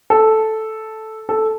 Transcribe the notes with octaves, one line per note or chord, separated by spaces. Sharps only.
A4
A4